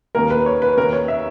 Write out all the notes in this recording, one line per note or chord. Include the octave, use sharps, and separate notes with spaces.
D#2 D#3 A#3 A#4
B4
C#5
B4
D#2 D#3 A#3 A#4
C#5
E5